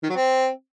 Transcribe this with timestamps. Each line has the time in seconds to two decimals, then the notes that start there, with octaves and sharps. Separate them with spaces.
0.03 D#3
0.09 F#3
0.16 C4